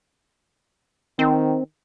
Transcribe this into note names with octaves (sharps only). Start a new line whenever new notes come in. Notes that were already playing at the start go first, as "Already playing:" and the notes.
D#3 C4